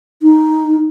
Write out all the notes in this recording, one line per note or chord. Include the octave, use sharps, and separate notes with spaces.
D#4